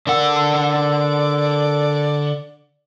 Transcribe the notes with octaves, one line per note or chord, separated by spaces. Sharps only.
D3 A#4 D5 F#5 E6